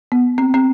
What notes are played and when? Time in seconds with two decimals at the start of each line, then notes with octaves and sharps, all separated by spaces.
0.12 B3
0.38 C4
0.54 C4